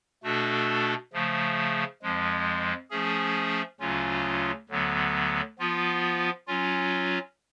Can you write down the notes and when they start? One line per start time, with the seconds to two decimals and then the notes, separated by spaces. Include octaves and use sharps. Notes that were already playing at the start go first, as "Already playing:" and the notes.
0.23 B2 A3 D4 F#4 A4
1.13 C#3 F3 A3
2.02 F2 F3 G#3
2.91 F3 A3 C#4 G#4
3.80 D2 C#3 F#3 C#4 F4
4.69 D2 D3 F#3 B3
5.59 F3 B3 F4
6.47 F#3 C#4 F4